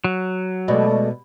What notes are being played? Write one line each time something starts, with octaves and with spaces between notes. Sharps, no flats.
F#3
B2 G#3 A3 D5 D#5